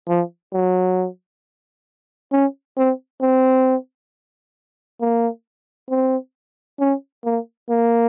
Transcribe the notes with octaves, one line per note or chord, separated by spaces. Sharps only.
F3
F#3
C#4
C4
C4
A#3
C4
C#4
A#3
A#3